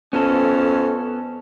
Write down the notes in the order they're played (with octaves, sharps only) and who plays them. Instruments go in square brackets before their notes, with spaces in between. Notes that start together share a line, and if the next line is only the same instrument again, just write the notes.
[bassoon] F2 [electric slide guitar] B3 A4 [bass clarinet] C#4